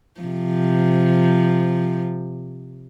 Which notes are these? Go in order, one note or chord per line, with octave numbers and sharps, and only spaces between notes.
C3 F3